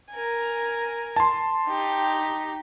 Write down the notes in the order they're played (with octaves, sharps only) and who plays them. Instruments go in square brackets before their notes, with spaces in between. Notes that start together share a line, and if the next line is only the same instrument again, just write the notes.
[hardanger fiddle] A#4 G#5
[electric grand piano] A5 C6
[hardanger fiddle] D#4 G4